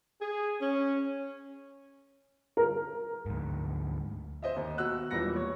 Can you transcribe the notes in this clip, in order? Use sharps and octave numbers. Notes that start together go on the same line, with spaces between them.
G#4
C#4
A#4
D2 G#2
C5 D#5 E5
D#2
B2 F#4 E6 F#6
E1 A#2 E3 G3 A#6 C#7
C#5